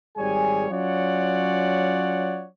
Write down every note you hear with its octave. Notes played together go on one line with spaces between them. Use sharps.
G#1 G3 G#4 C#5 G#5
F#3 C#4 F4 C#5 D5 F#5